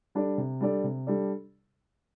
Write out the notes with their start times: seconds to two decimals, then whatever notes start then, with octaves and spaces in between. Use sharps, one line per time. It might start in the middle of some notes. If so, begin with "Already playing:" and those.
0.15 G3 D4 A4 D5
0.38 C3
0.61 G3 D4 A4 D5
0.84 C3
1.07 G3 D4 A4 D5